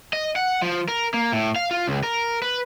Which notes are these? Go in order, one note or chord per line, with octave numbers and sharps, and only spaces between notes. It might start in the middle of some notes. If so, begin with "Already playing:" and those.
D#5
F#5
F3
A#4
A#3
A2
F5
F4
C#2
A#4
B4